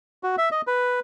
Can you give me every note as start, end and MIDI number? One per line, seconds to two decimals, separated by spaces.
0.23 0.36 66
0.38 0.49 76
0.52 0.61 75
0.67 1.00 71